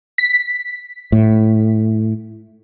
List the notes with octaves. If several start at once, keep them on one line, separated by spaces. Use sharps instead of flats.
B6
A2